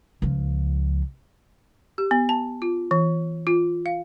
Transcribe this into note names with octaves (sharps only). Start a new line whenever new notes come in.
C#2 F3
G4
B3
A5
F4
E3
F4
F5